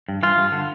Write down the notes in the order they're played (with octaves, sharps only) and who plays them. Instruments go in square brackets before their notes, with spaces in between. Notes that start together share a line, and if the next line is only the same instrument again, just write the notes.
[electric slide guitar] G2
E3 F4
G2
D3